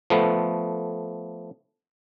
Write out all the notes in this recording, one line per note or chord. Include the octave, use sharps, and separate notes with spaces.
F3 A3 B3